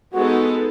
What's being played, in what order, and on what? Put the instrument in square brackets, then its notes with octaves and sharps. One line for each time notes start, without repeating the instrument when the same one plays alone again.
[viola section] G#3 B3 D#4 A4 [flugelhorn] F#4